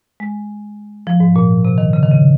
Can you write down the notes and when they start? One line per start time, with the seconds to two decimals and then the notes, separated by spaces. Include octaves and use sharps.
0.20 G#3
1.07 F3
1.20 G#2
1.36 A#2
1.65 C3
1.78 D#3
1.93 C#3
2.03 D#3
2.12 C#3